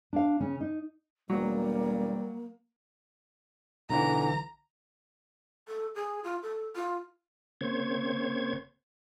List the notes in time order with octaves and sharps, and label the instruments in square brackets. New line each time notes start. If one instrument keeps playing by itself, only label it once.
[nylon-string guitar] D4 F5
C#3 C#4
D#4
[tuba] E1 [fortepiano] F#3 [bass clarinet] G3 [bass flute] A#3
[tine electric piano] B1 D3 E3 [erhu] A#5
[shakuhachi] A4
G#4
F4
A4
F4
[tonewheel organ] C#3 A#3 C4 C5 C#5 G#6